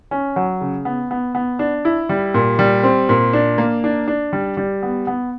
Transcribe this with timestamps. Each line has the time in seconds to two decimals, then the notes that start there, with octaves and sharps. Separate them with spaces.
0.11 C#4
0.36 F#3
0.61 C#3
0.85 B3
1.11 B3
1.35 B3
1.59 D4
1.85 E4
2.09 G3
2.34 A#2
2.59 G3
2.84 C4
3.09 A#2
3.33 D4
3.58 A#3
3.84 D4
4.08 D4
4.33 G3
4.57 G3
4.83 B3
5.07 B3